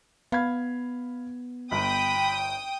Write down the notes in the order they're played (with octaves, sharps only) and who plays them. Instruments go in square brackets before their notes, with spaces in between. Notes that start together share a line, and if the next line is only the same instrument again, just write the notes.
[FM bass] B3 [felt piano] F5 B5 G#6
[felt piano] G1 [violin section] G5 D#6 [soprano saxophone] B5